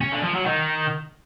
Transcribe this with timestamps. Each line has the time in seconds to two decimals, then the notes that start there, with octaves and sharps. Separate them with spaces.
0.01 C#4
0.12 D3
0.23 F3
0.35 F#3
0.46 D#3